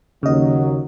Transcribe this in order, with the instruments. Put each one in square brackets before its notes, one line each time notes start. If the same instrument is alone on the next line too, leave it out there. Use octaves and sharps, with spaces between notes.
[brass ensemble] D#2 F#3 [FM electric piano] C#3 D#5